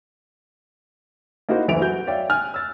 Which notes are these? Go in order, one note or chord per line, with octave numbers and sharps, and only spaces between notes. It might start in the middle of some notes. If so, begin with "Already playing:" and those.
A#3 D#4 E4 F#4 C5
F#1 D2 E3 E5 D7 F7
F#4 G6
C#5 D5 E5 F5 G5
G#5 F6 F#6
E6 A6